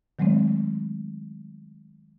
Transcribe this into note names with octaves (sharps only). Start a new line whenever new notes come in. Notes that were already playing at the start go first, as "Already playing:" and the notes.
D#3 F#3 G#3 A3 C4